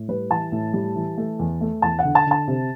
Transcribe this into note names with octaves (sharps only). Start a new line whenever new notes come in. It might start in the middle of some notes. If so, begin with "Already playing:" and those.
Already playing: A2
G3 B4
E3 A5
A2
G3
E3
A3
E2
A3
E2 A5
F#5
D3
A5
D3 A5
C3